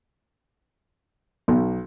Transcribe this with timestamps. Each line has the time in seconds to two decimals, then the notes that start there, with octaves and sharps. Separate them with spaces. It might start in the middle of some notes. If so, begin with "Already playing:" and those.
1.48 B1